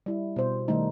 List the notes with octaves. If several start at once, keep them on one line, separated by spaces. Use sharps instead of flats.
G3 E4
B2 C5
D#3 G3 A3 D#4